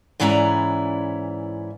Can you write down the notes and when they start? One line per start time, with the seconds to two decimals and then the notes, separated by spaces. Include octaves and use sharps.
0.20 G#2 E3 C#4 E4 D5 A#5